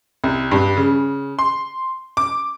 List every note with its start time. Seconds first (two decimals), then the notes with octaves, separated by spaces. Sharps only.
0.24 C2
0.52 G2
0.77 C#3
1.39 C6
2.17 D6